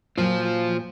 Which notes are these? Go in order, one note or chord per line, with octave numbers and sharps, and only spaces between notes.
A#2 F#3 F4 C5